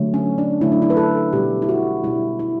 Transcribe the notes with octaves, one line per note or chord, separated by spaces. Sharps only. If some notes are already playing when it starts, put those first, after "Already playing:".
Already playing: D3 F#3 A3
C#4
D4
D3 F#3 A3 E4
D4
E4
B4
A4
B2 G3 G4
E4
F#4
B2 G3 E4
E4